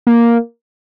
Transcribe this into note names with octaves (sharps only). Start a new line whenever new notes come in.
A#3